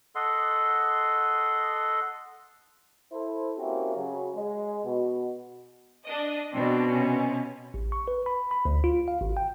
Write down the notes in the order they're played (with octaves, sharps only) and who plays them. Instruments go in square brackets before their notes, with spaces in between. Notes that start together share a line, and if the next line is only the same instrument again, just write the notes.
[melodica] A4 D#5 F#5 C6
[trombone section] E4 A4 C5
A#3 C4 C#4 E4 F#4 G4
C#3 F#3
G#3
B2
[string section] D4 D#5
[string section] B2 [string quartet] C4 D4 F#4
[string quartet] C3 C#4
[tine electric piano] A1
C#6
B4
B5
B5
D2
F4
F5
G#1
G5